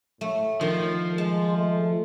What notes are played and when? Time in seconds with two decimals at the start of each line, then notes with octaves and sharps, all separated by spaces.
0.21 A2 A3
0.61 D#3 F3
1.18 G#3 A5
1.57 A3